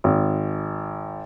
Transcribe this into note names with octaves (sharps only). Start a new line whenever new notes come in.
G#1